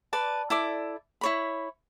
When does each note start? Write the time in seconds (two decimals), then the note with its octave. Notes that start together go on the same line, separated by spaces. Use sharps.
0.13 B4 D5 A5
0.50 E4 A4 D5 D6
1.21 E4 C#5 B5